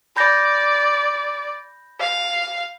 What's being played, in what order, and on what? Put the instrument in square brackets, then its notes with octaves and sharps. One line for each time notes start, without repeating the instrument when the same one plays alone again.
[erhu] D5 [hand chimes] B5 G6 A#6
[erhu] F5